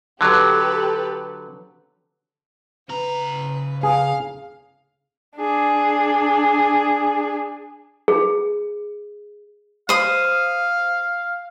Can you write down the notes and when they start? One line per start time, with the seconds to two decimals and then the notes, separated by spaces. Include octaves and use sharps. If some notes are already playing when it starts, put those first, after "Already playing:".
0.21 D3 F#3 G4 A4 B4
2.89 C#3 B4 A#5
3.83 G#4 F5
5.37 D4 G#4
8.08 G#4
9.89 C5 F5 D#6